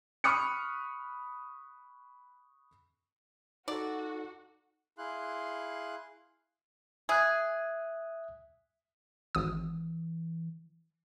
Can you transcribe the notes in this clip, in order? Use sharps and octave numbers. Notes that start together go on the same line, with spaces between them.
B5 C#6 D#6 F6 F#6 C#7
D#4 F#4 A4 D5
E4 G#4 F5 C6 F#6
G#4 E5 D#6 F#6
G#1 E3 D#6